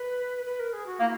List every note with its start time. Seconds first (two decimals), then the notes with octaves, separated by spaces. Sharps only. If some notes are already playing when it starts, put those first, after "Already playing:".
Already playing: B4
0.45 B4
0.60 A#4
0.73 G#4
0.86 F#4
1.00 A#3 E4